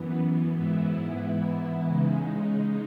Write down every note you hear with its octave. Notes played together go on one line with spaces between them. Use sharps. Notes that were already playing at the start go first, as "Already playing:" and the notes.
Already playing: F#2 E3 B3
G#2 E3 B3 E4
C#3 G#3 D#4